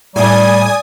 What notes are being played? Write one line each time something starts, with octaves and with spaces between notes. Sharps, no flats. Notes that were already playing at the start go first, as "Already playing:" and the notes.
A2 G3 D5 G#5 D#6